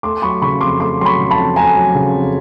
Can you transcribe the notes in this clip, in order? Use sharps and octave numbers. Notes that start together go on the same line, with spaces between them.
A3 C6 D6
F#3 B5 C#6
C#3 B5 C#6
F2 C6 D6
A3 C6 D6
F#3 C6
B5 C#6
C#3
A5 B5
F2
A3 G#5 A#5
F#3
C#3
F2